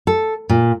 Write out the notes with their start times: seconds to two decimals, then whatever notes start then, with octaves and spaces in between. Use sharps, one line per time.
0.07 A4
0.49 A#2